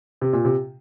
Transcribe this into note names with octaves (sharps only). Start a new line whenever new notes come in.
C3
A#2
C3